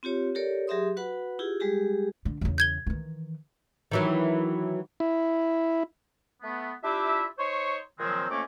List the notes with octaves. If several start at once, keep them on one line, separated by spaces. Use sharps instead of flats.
C4 F4 G4 C#5
G4 A4 A#4 C#5 D5
F#3 G4 G#4 E5 C6 D#6
F#4 B4 F#5 B5
E4 F4 G4 G#4
G3 G#3 G4 G#4
D3
E2 C#3
G6 G#6 G7
D#3 E3
D#3 E3 F#3
E4
A3 B3
D4 E4 F4 G4 E5
D#4 C5 C#5 C6 C#6
A#2 D#3 F3 F#3 G#3 C4
F2 A3 A#3 C#4 C#5 D6